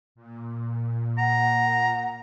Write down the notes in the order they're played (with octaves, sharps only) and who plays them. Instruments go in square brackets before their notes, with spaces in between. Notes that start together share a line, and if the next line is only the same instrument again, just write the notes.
[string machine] A#2
[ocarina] F#5 [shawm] A#5